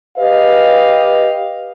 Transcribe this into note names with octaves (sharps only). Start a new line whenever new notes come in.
G4 B4 D#5 F5